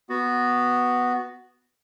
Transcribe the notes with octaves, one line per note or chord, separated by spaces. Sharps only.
B3 F#4